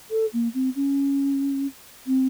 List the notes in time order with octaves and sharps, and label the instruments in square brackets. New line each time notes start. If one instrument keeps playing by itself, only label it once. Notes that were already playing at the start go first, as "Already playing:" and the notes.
[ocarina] A4
A#3
C4
C#4
C4